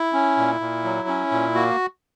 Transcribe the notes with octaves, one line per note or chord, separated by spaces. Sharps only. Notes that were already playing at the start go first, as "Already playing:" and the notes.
Already playing: E4
C#4
A#2
A#2
F#3
C#4
A#2
A#3 F#4